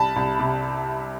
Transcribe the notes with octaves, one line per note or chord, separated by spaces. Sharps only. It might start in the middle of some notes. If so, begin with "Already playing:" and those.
Already playing: C2 A5 B5
C2
C3